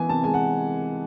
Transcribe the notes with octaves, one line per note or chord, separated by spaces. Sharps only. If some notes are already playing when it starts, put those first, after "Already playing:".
Already playing: E3 B3 G#5
C3 A5
G#3 G#5
F#5